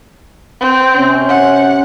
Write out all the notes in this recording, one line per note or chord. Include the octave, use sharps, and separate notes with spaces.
C4
C3 C#4
F#5